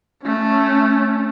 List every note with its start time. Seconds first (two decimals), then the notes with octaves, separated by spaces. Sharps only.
0.23 A3 C#4